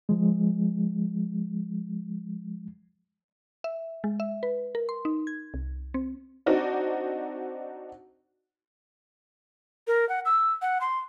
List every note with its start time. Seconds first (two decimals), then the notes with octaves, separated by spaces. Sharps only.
0.09 F3 G#3
3.64 E5
4.04 G#3
4.20 E5
4.43 B4
4.75 A#4
4.89 C6
5.05 D#4
5.27 G#6
5.54 C2
5.94 C4
6.46 C4 D4 D#4 F#4 D5
9.87 A#4
10.09 F#5
10.25 E6
10.62 F#5
10.81 C6